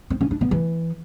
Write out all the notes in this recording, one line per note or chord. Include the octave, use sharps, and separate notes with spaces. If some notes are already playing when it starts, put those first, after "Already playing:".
C4
C#4
D4
B3
E3